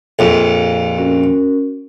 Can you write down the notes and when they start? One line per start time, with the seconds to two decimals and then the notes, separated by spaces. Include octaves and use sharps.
0.19 A#1 F2
0.98 C#4 F#4 A#4